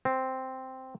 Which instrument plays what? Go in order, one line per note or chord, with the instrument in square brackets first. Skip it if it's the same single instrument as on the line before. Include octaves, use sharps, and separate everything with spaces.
[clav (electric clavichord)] C4